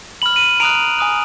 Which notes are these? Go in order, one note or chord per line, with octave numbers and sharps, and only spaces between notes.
B5 F6 F#7
D#7 F#7
A#5 D#6 F#6 D7 F7
G#5 D#6 F#6